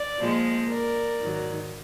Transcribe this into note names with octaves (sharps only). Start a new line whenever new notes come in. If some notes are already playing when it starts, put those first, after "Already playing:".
Already playing: D5
A#2 F3 G#3
A#4 D5
G#2 D#3 F#3